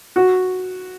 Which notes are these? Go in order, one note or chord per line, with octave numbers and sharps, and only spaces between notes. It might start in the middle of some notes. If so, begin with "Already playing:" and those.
F#4